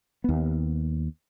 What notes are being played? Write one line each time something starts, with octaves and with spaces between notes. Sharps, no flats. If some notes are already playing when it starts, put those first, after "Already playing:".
D#2 B3